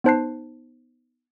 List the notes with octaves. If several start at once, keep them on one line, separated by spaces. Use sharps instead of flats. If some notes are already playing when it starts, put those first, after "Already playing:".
B3 D#4 C5 A5 F#6 C7